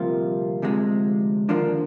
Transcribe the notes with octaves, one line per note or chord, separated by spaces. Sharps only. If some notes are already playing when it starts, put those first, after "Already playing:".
Already playing: D2 C3 F3 G3 A#3 F4
D2 C3 F3 G#3
D#2 D3 F3 A#3 D4